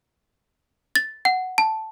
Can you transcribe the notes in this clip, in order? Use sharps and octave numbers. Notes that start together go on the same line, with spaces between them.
A6
F#5
A5